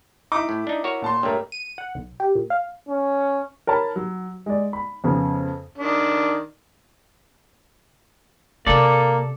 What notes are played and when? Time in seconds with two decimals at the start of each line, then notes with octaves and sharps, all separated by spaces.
0.32 D#4 E4 D6
0.49 A2
0.67 D4 D#4
0.84 F#4 A#4 C#5
1.02 A#2 A5 C6
1.23 G2 A3 A#4 C#5
1.52 D#7
1.78 F#5
1.95 B1
2.20 G4
2.35 A#2
2.50 F5
2.89 C#4
3.67 A#4 C#5 A5 B5
3.96 F#3
4.46 G#3 D5
4.73 B5
5.04 F2 C#3 B3
5.78 D#3 D4
8.67 C3 A#3 A4 D5